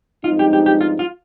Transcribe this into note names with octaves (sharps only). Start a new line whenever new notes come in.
G2 F3 G#3 C4 D#4 F4
G4
G4
G4
F4
F4